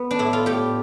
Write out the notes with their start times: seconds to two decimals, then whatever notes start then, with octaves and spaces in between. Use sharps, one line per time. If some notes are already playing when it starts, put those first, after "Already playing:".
Already playing: B3
0.11 D4
0.19 A2 E4
0.33 F4
0.46 A2 G4